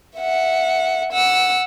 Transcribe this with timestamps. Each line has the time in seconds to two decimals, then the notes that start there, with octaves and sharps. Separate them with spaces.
0.17 E5 F#5
1.12 F#5 E6